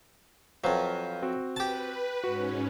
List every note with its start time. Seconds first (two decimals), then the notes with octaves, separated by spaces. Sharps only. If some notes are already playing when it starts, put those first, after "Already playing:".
0.64 F2 F#3 B4 C5 F5
1.23 C4 F#4
1.56 G4 B4 A5
2.24 G#2 C#4 F#4